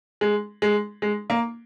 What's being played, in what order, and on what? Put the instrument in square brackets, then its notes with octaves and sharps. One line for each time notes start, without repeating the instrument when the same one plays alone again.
[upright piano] G#3
G#3
G#3
A#3